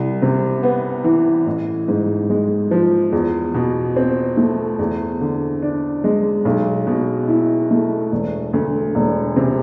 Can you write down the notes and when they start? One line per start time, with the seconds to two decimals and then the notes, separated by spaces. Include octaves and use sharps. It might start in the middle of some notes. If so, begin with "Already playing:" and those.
Already playing: C2
0.22 C3
0.63 B3
1.04 E3
1.46 A1
1.88 G#2
2.30 G#3
2.71 F3
3.12 E2
3.54 B2
3.96 C4
4.37 A3
4.79 E2
5.21 D3
5.62 D4
6.04 G#3
6.45 B1
6.87 B2
7.28 E4
7.71 A3
8.12 E1
8.53 D2
8.95 E1
9.36 C3